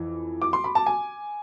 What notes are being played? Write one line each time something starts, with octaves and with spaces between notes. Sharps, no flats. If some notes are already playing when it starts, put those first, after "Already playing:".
Already playing: F2 E3
D6
C6
B5
A5
G#5